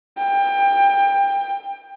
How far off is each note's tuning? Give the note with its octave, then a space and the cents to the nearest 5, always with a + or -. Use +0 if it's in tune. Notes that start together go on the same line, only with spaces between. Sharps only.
G5 +25